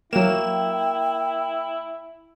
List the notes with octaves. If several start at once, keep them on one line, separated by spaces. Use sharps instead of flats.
F#3 A#3 E4 G5 E7